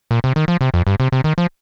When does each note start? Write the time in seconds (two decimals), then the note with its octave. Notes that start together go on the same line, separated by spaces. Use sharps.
0.11 A#2
0.24 C3
0.36 D#3
0.48 F3
0.61 C3
0.74 F2
0.87 G2
1.00 C3
1.12 C3
1.24 D#3
1.38 F3